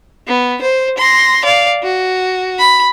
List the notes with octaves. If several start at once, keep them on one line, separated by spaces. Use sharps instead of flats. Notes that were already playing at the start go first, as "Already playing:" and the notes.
B3
C5
C6 A#6
D5 F5
F#4
B5